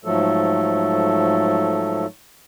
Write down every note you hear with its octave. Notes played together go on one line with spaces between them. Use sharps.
G#2 F3 F#3 A3 A4